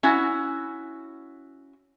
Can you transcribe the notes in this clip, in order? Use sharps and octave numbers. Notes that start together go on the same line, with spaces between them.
C#4 E4 F#4